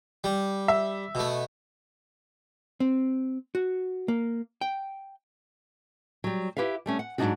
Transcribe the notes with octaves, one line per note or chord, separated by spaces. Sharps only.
G3
E5
B2 A3
C4
F#4
A#3
G5
F#3 G3
E4 G4 B4 E5 F5
G3 A3 C#4
F#5
G#2 C#3 F#3 D4 D#4 F#4